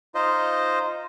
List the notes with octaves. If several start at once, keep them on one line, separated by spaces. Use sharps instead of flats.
D#4 F4 C5 D#5